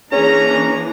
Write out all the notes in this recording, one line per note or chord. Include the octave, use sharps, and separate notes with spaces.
E3 A#3 C#4 D4 G#4 C#5 A#5